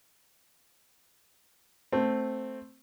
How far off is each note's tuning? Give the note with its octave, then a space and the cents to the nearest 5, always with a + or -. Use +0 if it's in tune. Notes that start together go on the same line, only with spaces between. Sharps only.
A3 +0 C4 +0